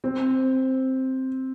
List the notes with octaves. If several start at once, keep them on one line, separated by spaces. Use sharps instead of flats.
C4